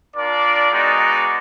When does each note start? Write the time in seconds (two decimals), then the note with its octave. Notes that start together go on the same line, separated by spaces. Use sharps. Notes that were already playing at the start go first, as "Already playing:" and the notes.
0.15 D4 F4 A#4 D5
0.72 G#3 B3 D#4 F#4 D5